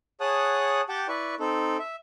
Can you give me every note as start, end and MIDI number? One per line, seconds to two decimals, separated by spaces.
0.21 0.81 68
0.21 0.81 73
0.21 0.81 78
0.21 0.81 81
0.21 0.81 87
0.21 0.81 90
0.89 1.07 67
0.89 1.07 78
0.89 1.07 79
0.89 1.07 81
0.89 1.07 86
1.08 1.35 64
1.08 1.35 71
1.08 1.35 74
1.08 1.35 85
1.40 1.77 60
1.40 1.77 63
1.40 1.77 69
1.79 1.96 76